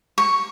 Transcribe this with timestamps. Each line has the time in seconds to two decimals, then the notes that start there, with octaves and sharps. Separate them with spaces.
0.18 C#6